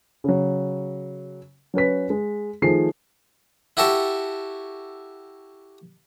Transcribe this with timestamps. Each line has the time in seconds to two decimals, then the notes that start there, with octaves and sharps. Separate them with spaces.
0.24 C#3 F#3
1.74 F#3 C#4 B4 B6
2.10 G#3
2.62 D#3 F3 A3 G#4 C7
3.77 E4 F#4 G4 A4 E5